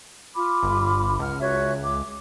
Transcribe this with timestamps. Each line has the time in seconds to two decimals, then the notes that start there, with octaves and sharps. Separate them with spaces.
0.35 F4 B5 D6
0.63 G1
1.19 C#2 F#5 F6
1.40 F#4 C#5 E5
1.84 D6